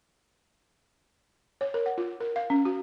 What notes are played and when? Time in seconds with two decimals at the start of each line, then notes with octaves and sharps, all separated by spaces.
1.61 C#5
1.74 A#4
1.86 F#5
1.98 F4
2.20 A#4
2.36 F5
2.50 C#4
2.65 F#4